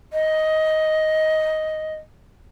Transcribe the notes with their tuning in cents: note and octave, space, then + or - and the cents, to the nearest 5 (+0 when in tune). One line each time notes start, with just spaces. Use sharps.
D#5 +10